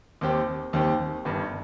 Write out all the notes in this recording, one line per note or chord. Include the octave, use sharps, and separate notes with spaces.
D#2 D#3 C4 G4
D#2 D#3 C4 G4
G1 G2 D#3